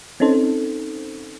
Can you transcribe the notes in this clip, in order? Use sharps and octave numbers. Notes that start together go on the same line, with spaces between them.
C4 C#4 D#4 A4 C5